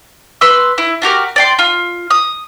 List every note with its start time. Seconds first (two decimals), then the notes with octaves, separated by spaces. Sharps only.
0.41 B4 C6 E6
0.78 E4
1.02 D4 F#4 G4 A#4
1.36 D5 G5 C6
1.59 F4
2.10 D#6